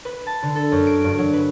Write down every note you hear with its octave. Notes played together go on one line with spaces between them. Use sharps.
B4
A5
D3
A4
F#2
D7
G2
F#3
B4